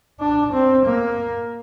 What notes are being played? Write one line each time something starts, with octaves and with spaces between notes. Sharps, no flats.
D4
C4
A#3